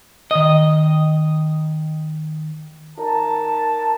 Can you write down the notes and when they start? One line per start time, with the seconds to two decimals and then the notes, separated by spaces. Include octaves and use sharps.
0.31 D#3 D#5
2.97 D#4 A#4 A5